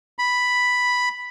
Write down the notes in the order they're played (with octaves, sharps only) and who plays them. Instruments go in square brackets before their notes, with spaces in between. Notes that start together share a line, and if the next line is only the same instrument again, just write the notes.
[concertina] B5